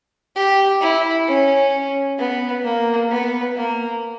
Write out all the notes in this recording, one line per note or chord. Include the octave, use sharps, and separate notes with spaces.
G4
E4
C#4
B3
A#3
B3
A#3